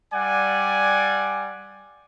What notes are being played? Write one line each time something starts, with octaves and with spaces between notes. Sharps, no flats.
G3 D5 F#5 G#5